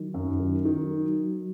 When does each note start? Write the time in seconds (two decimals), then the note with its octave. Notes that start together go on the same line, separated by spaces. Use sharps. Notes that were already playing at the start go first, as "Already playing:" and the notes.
Already playing: D#3 F#3
0.14 F#2
0.40 D#3
0.65 D#3